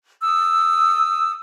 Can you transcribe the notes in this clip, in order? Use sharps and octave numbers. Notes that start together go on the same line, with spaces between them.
D#6 E6